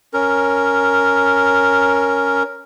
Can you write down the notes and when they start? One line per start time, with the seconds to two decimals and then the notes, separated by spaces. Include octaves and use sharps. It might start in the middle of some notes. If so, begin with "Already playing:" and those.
0.14 C#4 A#4